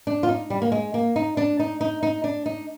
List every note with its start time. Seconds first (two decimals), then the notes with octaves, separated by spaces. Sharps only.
0.07 D4
0.23 F4
0.29 D#4
0.50 G3
0.62 A#3
0.72 G#3
0.94 A#3
1.16 D#4
1.37 D4
1.60 D#4
1.81 D#4
2.03 D#4
2.24 D4
2.46 D#4